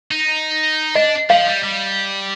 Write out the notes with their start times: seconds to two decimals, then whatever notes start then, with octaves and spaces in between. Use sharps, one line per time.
0.11 D#4
0.95 D4 D#5
1.30 F3 F5
1.47 G3
1.63 G3